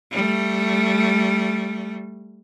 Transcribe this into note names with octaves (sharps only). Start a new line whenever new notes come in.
G3 A3